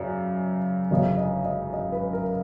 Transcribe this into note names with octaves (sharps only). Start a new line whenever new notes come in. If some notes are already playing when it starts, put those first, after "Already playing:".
Already playing: F#2 C#3 D5
G1 F#2 C#3 D#5
D#5
D#5
D#5
B4
A#4